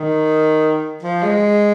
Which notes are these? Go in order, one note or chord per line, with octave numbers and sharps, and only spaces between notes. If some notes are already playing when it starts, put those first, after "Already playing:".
Already playing: D#3
F3
G#3